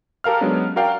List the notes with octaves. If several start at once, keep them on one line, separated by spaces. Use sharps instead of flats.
G4 A4 A#4 F5 F6
F#3 G#3 B3 C#4 D4
F#4 A#4 D5 F5 G5